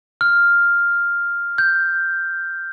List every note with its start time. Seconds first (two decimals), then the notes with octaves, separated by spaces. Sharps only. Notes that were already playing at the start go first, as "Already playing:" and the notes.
0.21 F6
1.58 G6